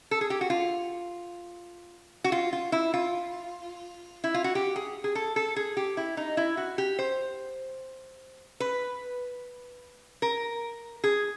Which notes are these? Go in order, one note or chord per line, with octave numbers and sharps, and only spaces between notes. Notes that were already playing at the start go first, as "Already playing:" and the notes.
A4
G#4
G4
F#4
F4
F#4
F4
F4
E4
F4
E4
F4
F#4
G4
G#4
G#4
A4
A4
G#4
G4
E4
D#4
E4
F#4
G4
C5
B4
A#4
G#4